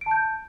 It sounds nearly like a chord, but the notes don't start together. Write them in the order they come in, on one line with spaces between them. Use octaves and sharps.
D7 A5 G6